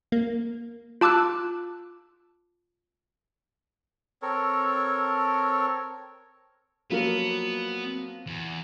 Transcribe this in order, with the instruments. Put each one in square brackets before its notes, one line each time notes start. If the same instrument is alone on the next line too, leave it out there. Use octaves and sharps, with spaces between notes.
[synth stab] A#3
[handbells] F4 A5 D6 E6 F#6
[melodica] C4 A4 A#4 C#5
[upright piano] F3 F#3 A#3 [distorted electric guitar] B3
[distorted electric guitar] E2